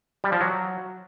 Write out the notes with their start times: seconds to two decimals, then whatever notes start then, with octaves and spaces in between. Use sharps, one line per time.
0.24 G3
0.32 F3
0.41 F#3